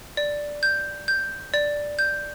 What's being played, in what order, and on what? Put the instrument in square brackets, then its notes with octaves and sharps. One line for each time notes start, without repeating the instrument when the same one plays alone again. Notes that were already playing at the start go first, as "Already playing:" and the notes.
[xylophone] D5
G6
G6
D5
G6